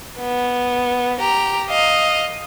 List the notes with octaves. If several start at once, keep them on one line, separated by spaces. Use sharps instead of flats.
B3
G4 A#5
D#5 F5